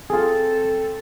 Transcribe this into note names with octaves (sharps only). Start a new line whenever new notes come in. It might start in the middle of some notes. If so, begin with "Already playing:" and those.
C4 F4 G#4 A4